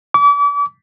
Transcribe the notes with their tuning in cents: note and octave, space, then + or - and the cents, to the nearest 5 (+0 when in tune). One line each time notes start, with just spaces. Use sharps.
D6 -40